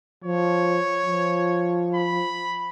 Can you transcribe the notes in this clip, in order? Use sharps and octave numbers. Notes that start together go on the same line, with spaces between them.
F3 C#5
F3
B5